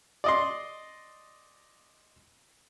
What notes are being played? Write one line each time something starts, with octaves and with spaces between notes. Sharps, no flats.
D5 D#5 C6